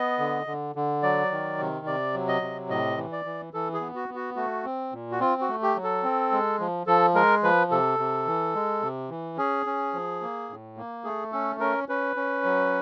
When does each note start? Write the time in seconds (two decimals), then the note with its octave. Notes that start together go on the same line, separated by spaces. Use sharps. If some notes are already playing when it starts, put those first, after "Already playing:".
Already playing: B3 D#5
0.19 D3
0.46 D3
0.75 D3
1.03 F#3 D5
1.31 D#3
1.59 C3
1.86 C3 D5
2.14 F#3
2.28 D#5
2.41 C3
2.69 A2 D#5
2.97 E3
3.12 D5
3.25 E3
3.54 E3 A4
3.74 G#4
3.80 B3
3.96 F#4
4.09 B3
4.16 F#4
4.36 A3 F#4
4.64 C4
4.93 A#2
5.12 F#4
5.20 C4 F4
5.41 F#4
5.49 A3
5.63 G4
5.76 F#3
5.83 A4
6.03 C4
6.32 G#3
6.60 F3
6.87 F3 A4
7.15 G#3 A#4
7.43 F3 B4
7.71 C3 A4
7.99 C3
8.27 E3
8.55 G#3
8.82 C3
9.10 E3
9.37 C#4 G#4
9.66 C#4
9.94 F3
10.21 A#3
10.49 A2
10.77 A#3
11.04 A3 G#4
11.32 C#4 A4
11.60 C#4 A#4
11.89 C#4 B4
12.16 C#4
12.44 F#3